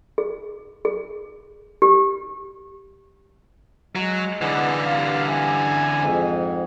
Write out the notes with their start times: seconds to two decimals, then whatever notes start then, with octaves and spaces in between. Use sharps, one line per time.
0.18 G#4
0.85 G#4
1.82 G4
3.95 F#3 G#3
4.41 D3 E3 G#4 B4 F#5
4.85 G2 F5
5.26 E4 E5 G#5
5.96 F2 G#2